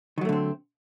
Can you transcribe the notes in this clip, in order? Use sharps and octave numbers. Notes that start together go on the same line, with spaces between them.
D3 D#3 F#3 A3 C4